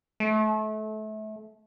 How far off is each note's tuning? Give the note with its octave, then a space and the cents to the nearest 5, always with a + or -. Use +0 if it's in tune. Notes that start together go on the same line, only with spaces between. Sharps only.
A3 -30